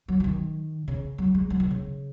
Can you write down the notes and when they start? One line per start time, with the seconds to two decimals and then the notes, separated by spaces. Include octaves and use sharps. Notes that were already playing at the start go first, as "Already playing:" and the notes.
0.08 F#3
0.20 F#3
0.24 D#3
0.88 C#3
1.18 F#3
1.35 G#3
1.50 F#3
1.60 D#3
1.70 C#3